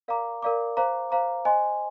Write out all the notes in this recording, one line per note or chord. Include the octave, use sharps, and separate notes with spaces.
A#4 D5 F5 A#5 D6
A#4 D5 F5 A#5 D6
C5 F5 A#5 D6
C5 F5 A#5 D6
C5 D#5 G#5 C6